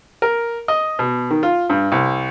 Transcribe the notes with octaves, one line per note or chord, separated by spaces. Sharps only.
A#4
D#5
B2
D#3
F4
G2
C2